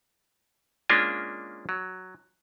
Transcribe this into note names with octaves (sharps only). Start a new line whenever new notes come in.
G#3 A#3 C#4 D4 F4
F#3